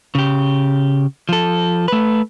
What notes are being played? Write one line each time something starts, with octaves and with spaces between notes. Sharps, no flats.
C#3 G4
F3 A4
A3 B4